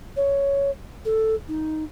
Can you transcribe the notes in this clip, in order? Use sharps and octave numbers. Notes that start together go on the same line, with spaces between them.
C#5
A4
D#4